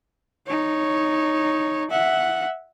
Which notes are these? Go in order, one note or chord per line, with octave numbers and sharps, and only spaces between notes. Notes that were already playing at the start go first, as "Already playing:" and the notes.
D#4 C#5
E5 F#5